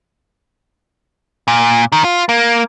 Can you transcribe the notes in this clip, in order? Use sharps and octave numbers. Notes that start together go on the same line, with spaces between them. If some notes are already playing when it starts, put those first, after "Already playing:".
A#2
D#3
F4
A#3